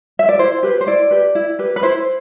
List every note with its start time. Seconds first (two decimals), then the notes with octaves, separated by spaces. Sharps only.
0.19 E5
0.29 D5
0.39 E4 C5
0.63 G4 B4
0.81 C5
0.87 E4 D5
1.11 G4 B4
1.35 E4
1.59 G4 B4
1.76 B4
1.83 E4 C5